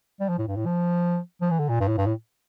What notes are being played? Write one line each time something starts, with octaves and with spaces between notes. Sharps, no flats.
G3
F3
A2
G2
A2
F3
F3
E3
D3
A#2
G2
A2
G2
A2